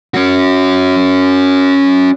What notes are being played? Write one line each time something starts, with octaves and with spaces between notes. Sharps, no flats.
C#4 F#4